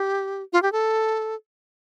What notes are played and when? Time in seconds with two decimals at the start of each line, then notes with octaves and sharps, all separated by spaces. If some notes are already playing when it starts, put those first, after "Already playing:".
Already playing: G4
0.53 F4
0.62 G4
0.72 A4